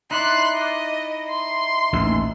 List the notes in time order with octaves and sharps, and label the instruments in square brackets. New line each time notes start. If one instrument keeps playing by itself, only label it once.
[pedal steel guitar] D#4 E4 D5 [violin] C6 F#6
[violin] D#5
C6
[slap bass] A1 D#2